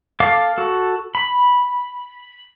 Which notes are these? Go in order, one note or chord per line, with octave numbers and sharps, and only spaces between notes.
A4 F5 D6
F#4 A4
B5